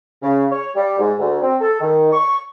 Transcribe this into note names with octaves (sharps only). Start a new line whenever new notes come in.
C#3
C#5
G3
G#2
D2
C4
A4
D#3
C#6